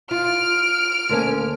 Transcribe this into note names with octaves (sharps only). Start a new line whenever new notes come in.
F4 F6 D7
D2 A#3 C#4